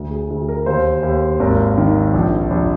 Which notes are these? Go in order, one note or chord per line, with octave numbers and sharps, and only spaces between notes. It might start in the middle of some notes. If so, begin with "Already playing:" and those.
Already playing: D2
G#4
D2
A#4
D#2 C5
D#2
G#1 A#4
D#3
A#1
A#1